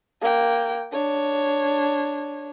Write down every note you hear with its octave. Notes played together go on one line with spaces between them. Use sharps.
A#3 G5
D4 C#5